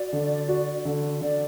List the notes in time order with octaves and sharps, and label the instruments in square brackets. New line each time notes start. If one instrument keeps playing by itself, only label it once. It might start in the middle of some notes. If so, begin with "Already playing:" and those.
Already playing: [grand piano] F#4 [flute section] D5
[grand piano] D3
F#4
D3
[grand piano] D3 [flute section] D5